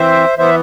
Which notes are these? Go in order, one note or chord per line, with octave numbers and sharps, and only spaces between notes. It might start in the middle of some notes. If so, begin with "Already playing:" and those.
Already playing: E3 C4 C5 E5
E3 B3 C5 E5